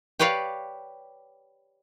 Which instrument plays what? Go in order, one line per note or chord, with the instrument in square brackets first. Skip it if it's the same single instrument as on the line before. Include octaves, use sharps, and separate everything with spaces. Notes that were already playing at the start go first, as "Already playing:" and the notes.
[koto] G4 B4 C#5 D5 F5